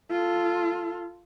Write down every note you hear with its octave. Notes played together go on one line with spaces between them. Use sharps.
F4 A4